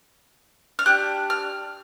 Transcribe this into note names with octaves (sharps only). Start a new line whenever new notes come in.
F6
D4 G4 F#6
F6